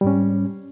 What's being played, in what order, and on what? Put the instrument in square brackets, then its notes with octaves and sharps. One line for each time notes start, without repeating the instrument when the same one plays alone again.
[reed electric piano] G3
G#2
C#4